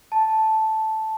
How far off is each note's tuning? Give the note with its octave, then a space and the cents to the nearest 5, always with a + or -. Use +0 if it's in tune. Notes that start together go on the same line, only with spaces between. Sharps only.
A5 -5